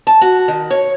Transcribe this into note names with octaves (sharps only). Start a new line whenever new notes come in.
A5
F#4
D#3
C#5